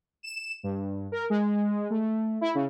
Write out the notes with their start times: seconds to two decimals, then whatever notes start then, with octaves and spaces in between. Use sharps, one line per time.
0.23 E7
0.63 G2
1.12 A#4
1.30 G#3
1.90 A3
2.41 E4
2.55 C#3